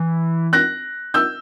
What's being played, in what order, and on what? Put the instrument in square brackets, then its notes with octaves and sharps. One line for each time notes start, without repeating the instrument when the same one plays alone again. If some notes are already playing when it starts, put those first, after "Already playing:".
Already playing: [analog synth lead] E3
[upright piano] F#6 A#6
E6 G6